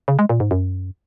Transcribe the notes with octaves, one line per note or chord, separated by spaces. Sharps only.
C#3
G#3
A#2
G#2
F#2